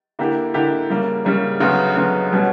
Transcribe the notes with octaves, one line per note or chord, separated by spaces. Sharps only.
D3 A#3 E4 G4
D3 A#3 E4 G4
C#3 G3 A#3
C#3 G3 A#3
D2 C#3 F#3 B3
D2 C#3 F#3 B3
B2 G3 C#4 F#4